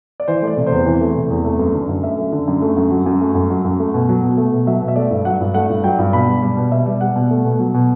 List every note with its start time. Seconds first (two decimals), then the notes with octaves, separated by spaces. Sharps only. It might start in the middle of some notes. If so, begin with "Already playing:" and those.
0.20 D5
0.28 E3 C5
0.42 A3
0.47 D5
0.57 C3
0.67 C5
0.72 E2
0.86 E3
1.01 A3
1.16 C3
1.30 E2
1.45 A3
1.59 F#2
1.74 D3
1.89 F#2
2.03 A3 E5
2.18 F#2
2.32 D3
2.48 F#2
2.62 A3
2.77 F#2
2.91 F#3
3.06 F#2
3.21 A3
3.35 F#2
3.50 F#3
3.65 F#2
3.80 A3
3.94 B2
4.09 F#3
4.23 B2
4.37 A3
4.52 B2
4.67 F#3 E5
4.82 B2
4.88 E5
4.96 A3 D5
5.11 G2
5.25 F#3 F#5
5.40 G2
5.54 A3 F#5
5.70 G2
5.84 F#3 G5
5.98 G2
6.13 B2 B5
6.28 G3
6.42 G3
6.57 B2
6.72 B2 E5
6.86 G3
7.01 G3 F#5
7.16 B2
7.30 A3
7.45 B2
7.60 F#3
7.74 B2